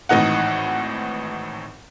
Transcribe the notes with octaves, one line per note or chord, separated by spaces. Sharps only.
G#1 A2 E3 D#4 F#5